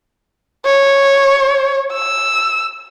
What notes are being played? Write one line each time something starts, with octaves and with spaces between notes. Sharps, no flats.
C#5
E6